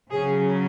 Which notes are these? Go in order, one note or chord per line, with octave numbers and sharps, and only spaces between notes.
C#3 F#3 C#4 G#4